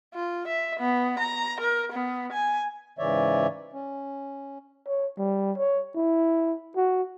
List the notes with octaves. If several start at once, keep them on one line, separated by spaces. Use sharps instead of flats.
F4
E5
B3
A#5
A#4
B3
G#5
G#2 C#3 E3 C#5 D5 E5
C#4
C#5
G3
C#5
E4
F#4